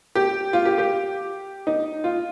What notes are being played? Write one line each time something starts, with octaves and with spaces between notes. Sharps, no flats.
G4
F4
G4
G4
D#4
F4